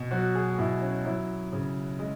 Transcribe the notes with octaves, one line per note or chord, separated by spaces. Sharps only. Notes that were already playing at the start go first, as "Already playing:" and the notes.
Already playing: B2
F#3 F#4
G#4
B2 E4
C#4
F#3 E4
C#3
G#3